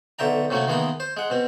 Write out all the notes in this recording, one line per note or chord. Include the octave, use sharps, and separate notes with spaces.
B1 D3 E5 G5 A#5
C3 F#3 A3 A#3 C#4
D#3 E3 G#3 A#3 B3 A#4
C5
G#3 F#5
B2 C4